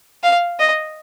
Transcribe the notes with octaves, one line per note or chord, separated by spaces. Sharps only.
F5
D#5